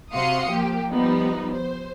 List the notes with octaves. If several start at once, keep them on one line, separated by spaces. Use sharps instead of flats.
C3 F#4 F5 C6 D#6 C#7
F3 A#3 G4
F3 G3 B3 D#4
C5